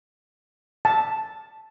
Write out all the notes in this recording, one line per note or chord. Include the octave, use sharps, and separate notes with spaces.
A5